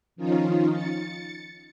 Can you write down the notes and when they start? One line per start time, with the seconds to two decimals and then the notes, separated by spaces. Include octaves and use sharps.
0.16 D#3 F3 C#4 D#4 F4
0.69 A6 C#7